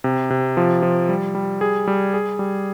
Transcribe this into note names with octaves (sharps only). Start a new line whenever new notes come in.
C3
C3
F3
F3
G3
G3
G#4
G3
G#4
G3